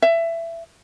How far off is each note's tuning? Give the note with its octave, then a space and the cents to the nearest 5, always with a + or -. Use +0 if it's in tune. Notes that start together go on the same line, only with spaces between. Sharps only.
E5 +20